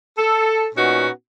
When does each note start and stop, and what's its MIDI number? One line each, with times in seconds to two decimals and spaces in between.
0.18 0.66 69
0.75 1.08 46
0.75 1.08 59
0.75 1.08 61
0.75 1.08 63
0.75 1.08 66